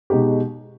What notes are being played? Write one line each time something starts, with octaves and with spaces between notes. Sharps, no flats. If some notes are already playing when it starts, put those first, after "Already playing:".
B2 G#3 D#4 G4